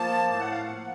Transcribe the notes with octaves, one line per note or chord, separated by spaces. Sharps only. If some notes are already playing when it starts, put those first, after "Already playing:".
Already playing: F3 A#3 A5
A2 A5
F#5
F5
F#5
F3 A#3